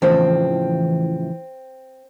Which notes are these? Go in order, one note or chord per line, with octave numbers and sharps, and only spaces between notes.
A2 C#3 E3 F3 C4